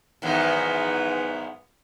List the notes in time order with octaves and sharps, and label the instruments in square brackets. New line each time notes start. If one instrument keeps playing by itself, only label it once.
[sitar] E2 D#3 F#3 [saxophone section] G#2 B3